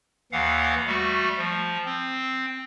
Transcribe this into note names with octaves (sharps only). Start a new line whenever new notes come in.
D#2 E3 F5 F#5
G3 A3 F#4
F3
C4